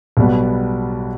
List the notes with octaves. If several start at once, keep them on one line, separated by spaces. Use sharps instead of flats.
B1 B2 G3 B3